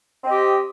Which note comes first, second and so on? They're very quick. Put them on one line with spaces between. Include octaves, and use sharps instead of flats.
C4 D#5 G4